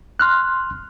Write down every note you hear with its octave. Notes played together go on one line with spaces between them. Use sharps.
C6 F6 F#6